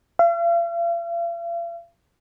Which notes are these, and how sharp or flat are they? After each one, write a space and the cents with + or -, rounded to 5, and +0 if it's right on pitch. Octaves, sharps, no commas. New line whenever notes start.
F5 -45